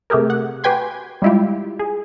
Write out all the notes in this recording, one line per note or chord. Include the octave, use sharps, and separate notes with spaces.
C3 A3 G4 G#4 A#4
F#5
F#4 G4 B4 G5 G#5 C6
G3 G#3 E4 F4 G4
G#4